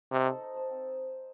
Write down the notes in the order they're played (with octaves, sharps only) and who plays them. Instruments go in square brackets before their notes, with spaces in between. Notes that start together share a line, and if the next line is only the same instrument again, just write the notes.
[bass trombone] C3 [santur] D#4
[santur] A4 C5
D#4
A4 C5
C4